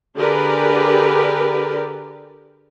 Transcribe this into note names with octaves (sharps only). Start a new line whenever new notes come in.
D3 G4 G#4 A#4 B4 D5